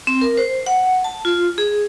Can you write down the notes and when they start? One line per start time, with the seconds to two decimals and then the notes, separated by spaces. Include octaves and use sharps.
0.07 C4
0.21 A#4
0.37 C5
0.66 F#5
1.04 A5
1.25 F4
1.58 G#4